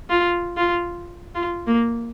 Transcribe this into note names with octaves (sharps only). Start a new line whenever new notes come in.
F4
F4
F4
A#3